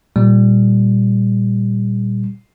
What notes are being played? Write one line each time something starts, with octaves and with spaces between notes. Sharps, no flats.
A#2 G3